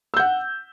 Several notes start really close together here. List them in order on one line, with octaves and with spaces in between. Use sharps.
E6 G6 F#5